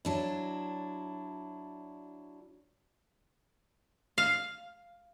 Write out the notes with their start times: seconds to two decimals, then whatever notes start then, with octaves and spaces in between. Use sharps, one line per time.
0.05 F#3 D4 E4
4.18 F5